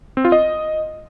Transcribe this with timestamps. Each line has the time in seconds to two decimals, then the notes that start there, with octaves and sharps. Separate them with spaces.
0.17 C4
0.25 F4
0.32 D#5